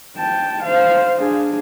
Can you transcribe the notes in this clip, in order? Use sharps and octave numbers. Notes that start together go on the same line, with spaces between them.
G5 A5
C5 F5
D4 G#4